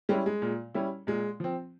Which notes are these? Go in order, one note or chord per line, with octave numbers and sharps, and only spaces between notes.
G3 G#3 C#4 E4
G#3
A#2
G3 C#4 E4
A#2 G#3
F3 C4